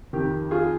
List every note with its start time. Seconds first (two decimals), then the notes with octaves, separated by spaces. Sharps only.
0.13 F2 D#3 G4
0.51 F4 G#4